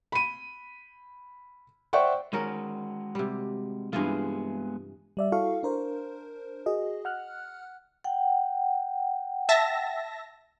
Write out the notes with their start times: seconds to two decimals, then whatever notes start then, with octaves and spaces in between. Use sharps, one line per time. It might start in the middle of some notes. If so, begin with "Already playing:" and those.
0.12 B5 D#7
1.93 C5 D5 E5 F#5 G5 C#6
2.33 D#3 G#3 C#4 F#4 A#4
3.15 C3 G3
3.93 G2 E3 G#3 B3 F4 G#4
5.17 G3 D5 E5
5.32 E4 F#4 A4 F5 C#6
5.63 D4 A#4 C5
6.66 F#4 G#4 D#5
7.05 F#5 F6 F#6
8.04 F#5 G5
9.49 E5 A5 A#6